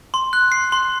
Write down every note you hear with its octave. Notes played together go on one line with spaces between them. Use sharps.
C6
F#6
C7
C6